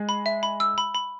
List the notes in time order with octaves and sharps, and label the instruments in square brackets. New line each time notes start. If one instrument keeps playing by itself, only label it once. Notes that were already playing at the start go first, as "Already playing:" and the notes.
Already playing: [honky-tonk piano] G#3
[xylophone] B5
E5
B5
E6
B5
B5